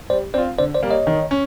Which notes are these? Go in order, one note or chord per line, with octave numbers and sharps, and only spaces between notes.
G3 C5 D5
C4 F4 C5 D5
D3 C5 D5
C5 D5
G3 A#3
C#5 D#5
D#3
C#4